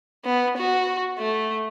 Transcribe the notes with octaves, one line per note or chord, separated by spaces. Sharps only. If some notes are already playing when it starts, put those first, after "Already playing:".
B3
F#4
A3